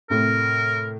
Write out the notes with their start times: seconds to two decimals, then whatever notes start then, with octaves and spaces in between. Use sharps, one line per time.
0.10 A2 C3 A#4